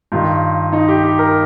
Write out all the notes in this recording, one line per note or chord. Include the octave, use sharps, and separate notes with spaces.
G2 D#3 F4
D#4
G4
G4
A#4